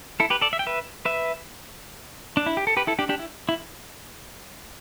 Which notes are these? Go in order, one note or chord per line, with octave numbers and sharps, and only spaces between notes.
E4 A4
G4 B4
A4 D5
E5
G5
B4 E5
B4 E5
D4
E4
G4
A4
G4 B4
E4 A4
D4 G4
D4 G4
E4
E4